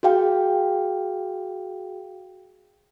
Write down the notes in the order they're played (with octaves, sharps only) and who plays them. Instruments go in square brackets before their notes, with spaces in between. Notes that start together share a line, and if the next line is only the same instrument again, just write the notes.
[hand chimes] F#4 G#4 F5 G5